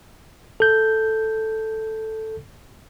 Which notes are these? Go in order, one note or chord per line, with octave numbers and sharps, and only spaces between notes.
A4 G6